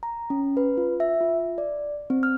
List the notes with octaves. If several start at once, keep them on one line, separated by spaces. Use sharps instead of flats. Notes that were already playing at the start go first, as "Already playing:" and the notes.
A#5
C#4
B4
F4
E5
F4
D5
C4
F6